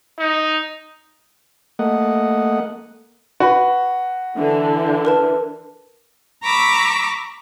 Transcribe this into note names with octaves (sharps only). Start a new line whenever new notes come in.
D#4
A3 A#3 D#5 F#5
F#4 B4
D3 E3 D4
A#4 B4 A5
A#5 B5 C#6 D6 E6